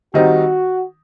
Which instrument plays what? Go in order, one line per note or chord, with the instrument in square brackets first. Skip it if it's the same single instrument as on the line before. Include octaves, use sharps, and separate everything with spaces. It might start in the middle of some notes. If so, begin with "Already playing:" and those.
[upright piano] D#3 G3 C4 D#4 [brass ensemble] F#4